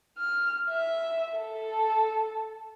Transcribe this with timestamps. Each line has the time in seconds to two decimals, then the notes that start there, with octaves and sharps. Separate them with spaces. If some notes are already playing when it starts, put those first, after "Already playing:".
0.18 F6
0.71 E5
1.38 A4